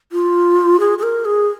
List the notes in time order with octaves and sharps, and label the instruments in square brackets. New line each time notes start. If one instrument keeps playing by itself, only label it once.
[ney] F4
G#4
G#4
A#4
G#4